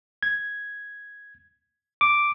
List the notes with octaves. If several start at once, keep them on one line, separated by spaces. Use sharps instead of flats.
G#6
D6